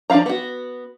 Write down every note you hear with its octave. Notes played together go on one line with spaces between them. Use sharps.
F3 D4 E4 F5 A#5
B3 F#4